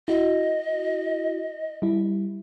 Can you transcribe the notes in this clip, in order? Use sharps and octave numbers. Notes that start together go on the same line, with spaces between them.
E4 F#4 D#5
G3 E4